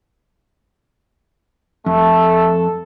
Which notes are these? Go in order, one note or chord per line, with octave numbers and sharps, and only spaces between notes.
F2 A3 A4